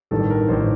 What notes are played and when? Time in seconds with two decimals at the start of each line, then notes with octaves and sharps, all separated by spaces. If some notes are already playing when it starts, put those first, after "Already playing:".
0.11 A1 G2 D#3 A4
0.30 A#4
0.48 A1 D#3 C5